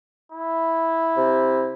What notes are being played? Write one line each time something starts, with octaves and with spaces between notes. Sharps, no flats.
E4
C3